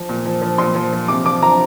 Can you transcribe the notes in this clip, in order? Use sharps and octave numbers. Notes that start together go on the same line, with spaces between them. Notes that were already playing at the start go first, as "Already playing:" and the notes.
Already playing: F3
A#2
F3
F3
A#2 C6
F3
F3
C3 D6
F3 D6
F3 A#5